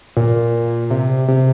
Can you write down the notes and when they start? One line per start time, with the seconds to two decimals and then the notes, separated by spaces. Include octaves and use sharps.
0.17 A#2
0.90 C3
1.28 C3